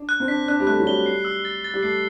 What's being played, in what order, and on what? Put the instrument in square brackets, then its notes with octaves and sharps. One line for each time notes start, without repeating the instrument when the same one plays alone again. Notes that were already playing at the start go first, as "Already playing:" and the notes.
Already playing: [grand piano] D4
[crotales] F#6
[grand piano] C4
[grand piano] D4 [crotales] B6
[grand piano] D4 [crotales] F#6
[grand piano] G3
[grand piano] A3 [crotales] F#6
[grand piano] F#3
[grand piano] G3 [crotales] G7
[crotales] C7
E6
A6
A6
[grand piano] G3
[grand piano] A3 [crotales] C7